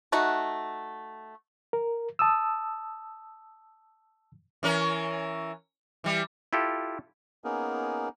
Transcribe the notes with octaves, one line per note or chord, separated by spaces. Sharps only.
A3 D#4 F#4 F#5
A#4
A5 D#6 E6
E3 C#4 A#4
E3 G3
E4 F4 G4 A4
A#3 B3 C#4 D#4 G#4 A#4